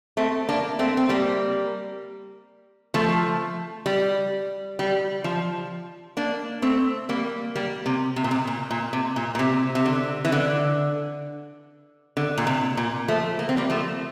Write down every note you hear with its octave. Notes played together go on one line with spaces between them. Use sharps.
A3 C4
A#3 D4
A3 C4
C4
G3 A#3
F3 A3
G3
G3
F3
A#3 D4
A3 C4
G3 A#3
G3 A#3
C3
C3
A#2
C3
A#2
A#2
C3
A#2
A#2
C3
C3
D3
E3
D3
D3
A#2
C3
A#2
F3 A3
A#3
C4
G3 A#3
F3 A3